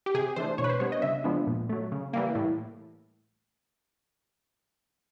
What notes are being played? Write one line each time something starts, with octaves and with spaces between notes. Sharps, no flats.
G4
C3 G#4
E3 A3 D4 C5
B2 C#5
B4
C5
G3 B3 D4 C#5
D#5
C#3 E5
F3 G#3 B3 D4
A#2
F#3 A3
C#3
E3 G3 A#3
A2